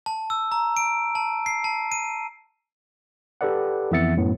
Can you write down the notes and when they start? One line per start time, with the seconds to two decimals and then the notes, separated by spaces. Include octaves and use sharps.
0.06 A5
0.30 E6
0.52 A#5
0.77 D7
1.15 A5
1.46 C7
1.64 A5
1.92 D#7
3.41 G4 A4 B4 D5 F#5
3.91 F2 E3 B3 E5 A6 C#7
4.17 F#2 A2 B3